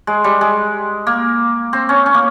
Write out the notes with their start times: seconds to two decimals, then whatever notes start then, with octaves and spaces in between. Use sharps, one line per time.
0.07 G#3
0.24 G3
0.41 G#3
1.07 A#3
1.73 C4
1.89 C#4
2.06 C#4
2.14 A#3